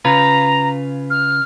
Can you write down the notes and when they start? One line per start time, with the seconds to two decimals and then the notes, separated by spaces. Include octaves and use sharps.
0.05 C#3 F4 B4 A#5
1.10 F6